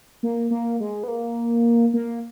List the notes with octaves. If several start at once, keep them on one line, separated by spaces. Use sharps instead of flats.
A#3
A#3
G#3
B3
A#3
A#3